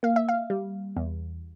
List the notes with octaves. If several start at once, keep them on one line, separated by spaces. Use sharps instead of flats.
A#3 F5
E5
F5
G3
E2